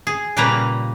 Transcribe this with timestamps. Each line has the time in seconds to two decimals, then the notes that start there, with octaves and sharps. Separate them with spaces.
0.07 G#4
0.37 A#2 C#3 G3 A#3 B4 A#5